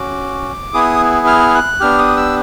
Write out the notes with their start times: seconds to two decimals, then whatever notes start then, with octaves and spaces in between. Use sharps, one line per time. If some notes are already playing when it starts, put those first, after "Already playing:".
Already playing: C#4 F#4 D6
0.74 B3 E4 G#4 D#6
1.27 F6
1.55 F#6
1.80 B3 D4 G4 F6
1.98 D#6
2.17 E6